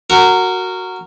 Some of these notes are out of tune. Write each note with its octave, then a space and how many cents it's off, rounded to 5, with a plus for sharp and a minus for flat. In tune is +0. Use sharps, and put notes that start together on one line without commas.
F#4 +0 A#4 -15